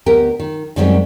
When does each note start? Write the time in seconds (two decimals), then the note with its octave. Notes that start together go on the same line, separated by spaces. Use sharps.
0.06 D2 B3 G4 A#4
0.40 D#3
0.76 F#2 D#3 G3 G#3 C4 C#4